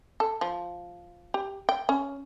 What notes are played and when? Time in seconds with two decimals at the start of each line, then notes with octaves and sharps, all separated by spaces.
0.20 A4
0.41 F3
1.34 G4
1.69 G5
1.89 C#4